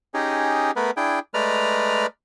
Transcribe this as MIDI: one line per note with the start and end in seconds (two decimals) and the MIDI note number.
0.14 0.71 61
0.14 0.71 63
0.14 0.71 67
0.14 0.71 68
0.76 0.91 57
0.76 0.91 59
0.76 0.91 70
0.76 0.91 71
0.97 1.19 62
0.97 1.19 64
0.97 1.19 68
0.97 1.19 79
1.34 2.06 56
1.34 2.06 57
1.34 2.06 71
1.34 2.06 74
1.34 2.06 82
1.34 2.06 89